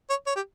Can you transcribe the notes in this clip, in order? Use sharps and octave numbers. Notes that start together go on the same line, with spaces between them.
C#5
C#5
G4